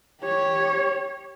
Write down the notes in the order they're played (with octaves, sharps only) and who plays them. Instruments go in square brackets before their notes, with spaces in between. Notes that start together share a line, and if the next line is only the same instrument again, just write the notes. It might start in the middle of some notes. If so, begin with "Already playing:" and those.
[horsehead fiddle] G4 C#5